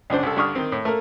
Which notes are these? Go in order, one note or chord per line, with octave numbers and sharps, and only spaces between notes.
C#2 F#2 D4 C5
C2 A4
G2 D3 D4 C#6 D#6 F6
D#3 C4
A2
A3 A#3 A#4